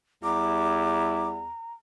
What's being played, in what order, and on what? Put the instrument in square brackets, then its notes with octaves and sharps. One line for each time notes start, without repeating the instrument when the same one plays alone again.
[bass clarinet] E2 [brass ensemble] G3 E4 [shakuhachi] A#5 [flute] D6